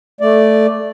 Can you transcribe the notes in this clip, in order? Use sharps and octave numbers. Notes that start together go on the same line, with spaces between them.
A3 D5